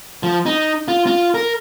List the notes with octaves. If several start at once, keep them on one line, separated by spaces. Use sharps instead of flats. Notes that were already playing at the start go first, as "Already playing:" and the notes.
F3
D#4
F4
F4
A#4